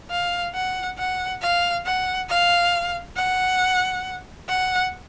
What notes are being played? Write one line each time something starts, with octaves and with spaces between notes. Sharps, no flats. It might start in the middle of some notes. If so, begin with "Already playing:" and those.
F5
F#5
F#5
F5
F#5
F5
F#5
F#5